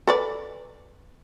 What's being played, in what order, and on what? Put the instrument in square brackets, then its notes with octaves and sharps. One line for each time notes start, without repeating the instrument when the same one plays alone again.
[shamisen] A4 B4 D5